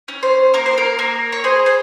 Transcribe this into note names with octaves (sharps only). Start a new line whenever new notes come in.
C#4
C5
A#3 A#4
C5
A#4
A#3 A#4
C#5
G#4 C5
C5